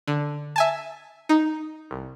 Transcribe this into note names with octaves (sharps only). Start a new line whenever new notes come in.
D3
E5 G#5 A5
D#4
C2